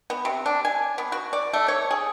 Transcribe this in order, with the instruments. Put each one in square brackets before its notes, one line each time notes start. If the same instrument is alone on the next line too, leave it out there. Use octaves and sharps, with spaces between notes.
[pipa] B3
C3
D4
G#5
B3
F#4
D5
A3
C#5
G#4